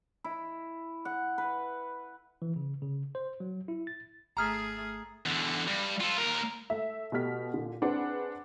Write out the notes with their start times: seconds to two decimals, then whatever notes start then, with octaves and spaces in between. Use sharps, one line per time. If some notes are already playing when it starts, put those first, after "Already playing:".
0.24 E4
1.05 F#5
1.38 B4
2.42 E3
2.56 C#3
2.82 C#3
3.15 C5
3.40 F#3
3.68 E4
3.87 A6
4.37 G#1 A3 G#4 A#5 D#6 F6 C7
5.26 E2 D3
5.67 G2
6.01 F4 A4
6.18 D#2 A#4
6.70 A3 E5
7.12 B2 A3 G4 F6 B6
7.54 A#2 D3
7.82 C4 D4 G#4 B4 F#5